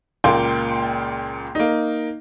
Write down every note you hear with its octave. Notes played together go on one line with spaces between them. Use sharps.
C#2 A#2 A#3 F4 G5 C6
A#3 D#4